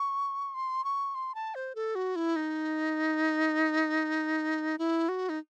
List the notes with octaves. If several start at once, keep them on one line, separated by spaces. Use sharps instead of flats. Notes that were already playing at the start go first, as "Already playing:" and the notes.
Already playing: C#6
C6
C#6
C6
A5
C5
A4
F#4
E4
D#4
E4
F#4
D#4